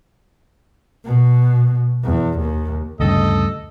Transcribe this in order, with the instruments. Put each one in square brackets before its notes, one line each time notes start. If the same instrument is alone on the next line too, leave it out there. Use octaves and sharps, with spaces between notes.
[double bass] B2
E2
D#2
[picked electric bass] D2 G2 C#3 [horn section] A4 D#5